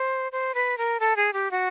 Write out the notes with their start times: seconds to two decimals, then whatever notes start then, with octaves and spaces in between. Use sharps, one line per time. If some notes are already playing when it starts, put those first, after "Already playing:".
Already playing: C5
0.32 C5
0.55 B4
0.78 A#4
1.00 A4
1.16 G#4
1.33 G4
1.51 F#4